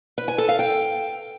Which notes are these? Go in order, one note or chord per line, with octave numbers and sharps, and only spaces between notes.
B4
G#5
A4
F5
G5